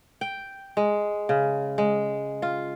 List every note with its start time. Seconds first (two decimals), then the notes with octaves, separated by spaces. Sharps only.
0.21 G5
0.77 G#3
1.29 C#3
1.78 G#3
2.42 F4